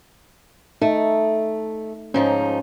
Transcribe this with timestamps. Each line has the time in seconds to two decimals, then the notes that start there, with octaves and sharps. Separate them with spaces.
0.82 A3 D#4
2.14 G#2 F3 C#4 D#4